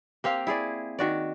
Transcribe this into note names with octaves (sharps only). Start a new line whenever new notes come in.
A#3 C4 G4 F5
E4 G#4 D5
D#3 F#4 D5